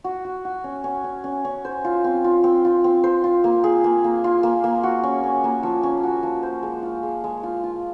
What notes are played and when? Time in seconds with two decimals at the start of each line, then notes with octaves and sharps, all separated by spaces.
0.04 F#4
0.25 F#4
0.45 F#4
0.64 C#4
0.84 C#4
1.04 C#4
1.24 C#4
1.45 C#4
1.65 C5
1.84 F4
2.04 C4
2.24 F4
2.44 C4
2.65 F4
2.84 C4
3.04 C5
3.24 F4
3.44 A#3
3.64 G#4
3.84 A#3
4.04 A#3
4.24 F4
4.43 A#3
4.64 A#3
4.83 F#4
5.03 C#4
5.24 C#4
5.44 A#3
5.63 F3
5.83 C#4
6.03 F#4
6.23 F3
6.43 C5
6.63 G#3
6.83 F4
7.03 G#3
7.24 G#3
7.43 F4
7.63 F4